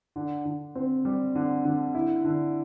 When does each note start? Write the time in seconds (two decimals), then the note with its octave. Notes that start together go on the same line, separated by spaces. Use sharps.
0.16 D3
0.45 D3
0.75 C4
1.05 G3
1.35 D3
1.65 D3
1.95 E4
2.25 D3